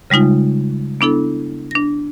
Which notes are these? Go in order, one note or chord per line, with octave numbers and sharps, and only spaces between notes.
C#3 G3 G#3 D#4 F4
B3 D4 E4 A4
D4 A#6